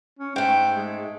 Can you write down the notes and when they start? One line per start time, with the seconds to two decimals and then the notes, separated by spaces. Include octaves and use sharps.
0.19 C#4
0.36 G#2 A3 G5
0.76 G#3